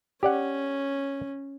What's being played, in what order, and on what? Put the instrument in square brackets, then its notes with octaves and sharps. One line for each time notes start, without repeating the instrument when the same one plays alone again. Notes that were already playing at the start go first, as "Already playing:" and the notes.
[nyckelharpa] C#4 [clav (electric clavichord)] G4 D5 F#5